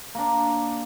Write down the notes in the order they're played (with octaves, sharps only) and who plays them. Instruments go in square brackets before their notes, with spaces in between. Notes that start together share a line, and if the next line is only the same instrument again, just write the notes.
[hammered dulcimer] A#3 D4